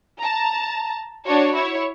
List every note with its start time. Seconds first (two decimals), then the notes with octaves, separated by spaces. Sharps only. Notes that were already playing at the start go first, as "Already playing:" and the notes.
0.19 A5 A#5
1.25 D4 F#4 C#5
1.54 E4 C#5